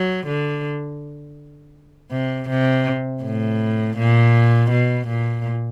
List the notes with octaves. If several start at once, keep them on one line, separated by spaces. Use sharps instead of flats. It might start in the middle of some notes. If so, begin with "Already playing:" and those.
Already playing: F#3
D3
C3
C3
A2
A#2
B2
A#2